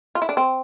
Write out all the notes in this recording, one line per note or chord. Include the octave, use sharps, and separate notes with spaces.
F4
E4
D4
C4